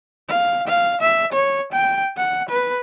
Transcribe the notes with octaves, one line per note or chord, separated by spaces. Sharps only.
F5
F5
E5
C#5
G5
F#5
B4